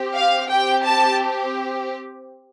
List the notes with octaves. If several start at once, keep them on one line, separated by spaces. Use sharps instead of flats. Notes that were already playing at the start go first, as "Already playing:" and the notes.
Already playing: C4 G4
F5
C4 G4 G5
A5